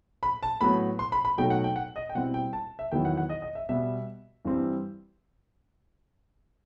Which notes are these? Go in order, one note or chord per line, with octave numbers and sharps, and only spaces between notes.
B5
A5
A2 F#3 B3 B5
C6
B5
B5
B2 F#3 A3 D#4 G5
F#5
G5
F#5
D#5
G5
B2 G3 C4 E4 F#5
G5
A5
E5
E2 D#3 F#3 B3 E4 G5
F#5
F#5
D#5
D#5
E5
B2 G3 B3 E5
G2 E3 G3 C4